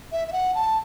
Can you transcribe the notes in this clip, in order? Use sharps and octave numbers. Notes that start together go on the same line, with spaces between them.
E5
E5
F#5
A5